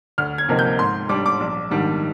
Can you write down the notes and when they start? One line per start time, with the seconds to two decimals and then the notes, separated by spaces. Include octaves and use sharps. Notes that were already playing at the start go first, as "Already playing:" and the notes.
0.18 D2 F6
0.38 G#6
0.49 C3 F3 A#3 D#4
0.59 G6
0.79 G#2 C6
1.09 G3 D4 D6
1.26 D6
1.40 A#1
1.71 G#2 D#3 G3 D4